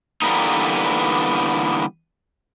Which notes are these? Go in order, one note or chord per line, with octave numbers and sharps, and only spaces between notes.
D3 E3 G3 A#3 B3 D#4